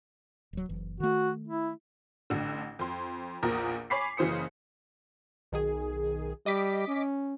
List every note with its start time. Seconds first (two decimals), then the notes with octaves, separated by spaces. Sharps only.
0.53 D1 F#3
0.69 F#1 E3
1.00 D#3 A3 F#4
1.48 E4
2.30 A1 D3
2.79 F2 C6
3.43 A#1 E2 A#2 A#4 D#6
3.90 C#5 G#5 B5 D6 B6 C7
4.17 F#1 C#3 E3 C5 D#6 C#7
5.52 B1 D#3 G#4
6.46 G3 D#5 D6 B6
6.87 C#4